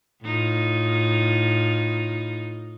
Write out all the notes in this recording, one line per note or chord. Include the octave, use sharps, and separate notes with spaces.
A2 D#4 F4